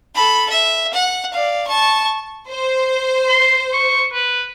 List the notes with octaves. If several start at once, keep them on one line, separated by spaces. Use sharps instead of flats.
A4 B5
E5
F#5
D5 F5
A5 C#6
C5
C6
C#6
B4